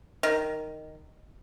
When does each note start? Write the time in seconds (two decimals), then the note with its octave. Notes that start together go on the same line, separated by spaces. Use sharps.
0.23 D#3